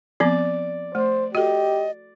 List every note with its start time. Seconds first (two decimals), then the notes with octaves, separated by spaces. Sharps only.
0.20 F3 B3 C4 D5
0.95 A3 C5
1.35 F#4 G4 A4 D#5